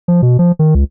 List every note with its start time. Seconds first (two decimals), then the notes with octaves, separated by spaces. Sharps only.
0.08 F3
0.22 B2
0.39 F3
0.59 D#3
0.75 C#2